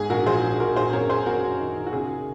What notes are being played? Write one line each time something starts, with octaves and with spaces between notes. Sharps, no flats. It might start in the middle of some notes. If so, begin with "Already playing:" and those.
Already playing: G#2 G#4
A#1 F#4 A#4
F3 G#4 C5
A#1
A#1 F#4 A#4
A#1 G#4 C5
F#2 A#4 C#5
F#2 G#4 C5
F#2 F#4 A#4
F#2
D#3
D#3
F#4
C#3 G#4